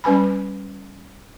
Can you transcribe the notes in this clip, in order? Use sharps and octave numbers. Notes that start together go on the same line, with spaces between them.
G3 C#4 B4 G#5 B5